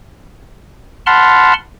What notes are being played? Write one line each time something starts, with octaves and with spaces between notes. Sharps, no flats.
F#5 A5 B5 C6 F6